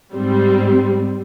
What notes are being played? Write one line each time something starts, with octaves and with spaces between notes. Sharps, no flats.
G#2 G3 C4